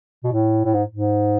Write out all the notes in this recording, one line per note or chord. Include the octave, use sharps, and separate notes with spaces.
B2
A2
A2
G#2
G#2